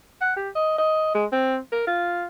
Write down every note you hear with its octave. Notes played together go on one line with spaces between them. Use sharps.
F#5
G4
D#5
D#5
G#3
C4
A#4
F4